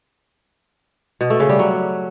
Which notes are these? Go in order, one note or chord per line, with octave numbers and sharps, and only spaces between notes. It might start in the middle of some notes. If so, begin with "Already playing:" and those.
B2
A3
C#3
G3
F#3